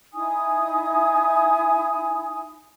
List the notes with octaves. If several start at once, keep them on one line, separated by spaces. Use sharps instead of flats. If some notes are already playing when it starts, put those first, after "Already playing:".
D#4 E4 G#5 D#6